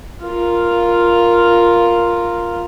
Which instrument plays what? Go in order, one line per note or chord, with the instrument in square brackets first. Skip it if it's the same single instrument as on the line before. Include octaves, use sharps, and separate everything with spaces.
[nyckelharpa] F4 A#4